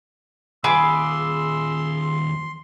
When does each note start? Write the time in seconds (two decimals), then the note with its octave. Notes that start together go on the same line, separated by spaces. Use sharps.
0.64 D#2 F4 G#4 B4 C6 D6 E6